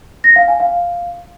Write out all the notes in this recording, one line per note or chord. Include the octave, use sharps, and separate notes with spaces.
A#6
F5
G#5
F5